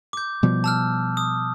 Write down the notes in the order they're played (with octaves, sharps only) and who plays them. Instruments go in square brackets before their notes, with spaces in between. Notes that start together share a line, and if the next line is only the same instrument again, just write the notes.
[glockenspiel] D6 G6
[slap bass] B2 F3 G3
[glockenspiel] A5 E6 F6
D#6